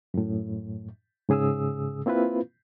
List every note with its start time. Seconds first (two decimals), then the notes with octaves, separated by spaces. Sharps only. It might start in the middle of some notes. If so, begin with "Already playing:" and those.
0.14 F#2 A2
1.29 G#2 C#3 G#4 D#6 E6
2.06 A#3 C4 E4 F4 B4